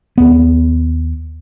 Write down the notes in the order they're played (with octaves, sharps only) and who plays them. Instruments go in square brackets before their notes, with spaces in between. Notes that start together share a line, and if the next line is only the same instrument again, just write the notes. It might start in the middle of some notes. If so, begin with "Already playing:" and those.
[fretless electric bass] D#2 B3